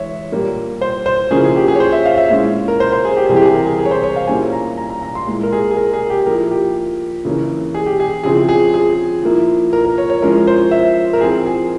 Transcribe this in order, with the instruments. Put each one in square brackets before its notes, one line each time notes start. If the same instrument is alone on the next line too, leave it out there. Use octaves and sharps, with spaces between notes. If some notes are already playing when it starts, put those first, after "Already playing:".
Already playing: [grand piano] E3 G#3 C#5 E5
A#2 G3 A#3
C5
C5
C#3 F3 A#3 C#4 E4 G#4
G#4
G4
G#4
C#5
C5
E5
F5
E5
A#2 G#3 C#4 E4
A#4
C5
C5
G#4
G4
C3 E3 G3 C4 E4 G#4
G4
G#4
A#4
G#4
G#4
C#5
C5
C#5
F5
A#2 G3 A#3 C#4 E4 G#5
A#5
A#5
A#5
A#5
C6
A#2 G#3 E4
A#4
G#4
G#4
A#4
G#4
G4
F3 A#3 E4 A#4
G4
C#3 E3 A#3 C#4 E4
G#4
G4
G#4
C#3 F3 C4 E4 G#4
G#4
G#4
F3 A#3 E4
A#4
A#4
C#5
C#5
F3 G#3 C#4 E4 A#4
C5
E5
A#4
F3 C4 E4 G#4
G#4